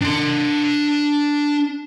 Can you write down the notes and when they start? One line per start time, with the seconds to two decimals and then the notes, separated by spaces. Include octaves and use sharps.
0.01 D4 C6